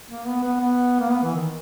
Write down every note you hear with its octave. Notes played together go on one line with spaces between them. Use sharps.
A#3
B3
B3
B3
A#3
B3
E3
D#3